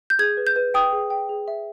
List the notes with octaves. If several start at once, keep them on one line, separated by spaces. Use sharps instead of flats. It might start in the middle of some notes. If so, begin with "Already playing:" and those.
G6
G#4 G#6
B4
G6
B4
G5 D#6
G#4
G5
G#4
E5